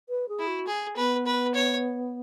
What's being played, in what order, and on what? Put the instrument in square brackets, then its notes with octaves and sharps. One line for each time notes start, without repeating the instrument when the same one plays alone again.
[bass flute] B4
G#4
[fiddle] E4
[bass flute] F#4
[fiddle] G#4
[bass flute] B3 [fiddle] B4
[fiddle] B4
C#5